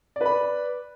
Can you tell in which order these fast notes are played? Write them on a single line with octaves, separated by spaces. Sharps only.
D5 B4 B5